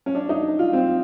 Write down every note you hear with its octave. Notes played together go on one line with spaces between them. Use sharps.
C#4
D4
D#4
F4
C4